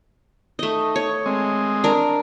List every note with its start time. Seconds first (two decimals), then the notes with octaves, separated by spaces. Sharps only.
0.59 A3 D#4 D#5
0.96 C#5
1.26 G#3 C4 D#5
1.84 D4 A#4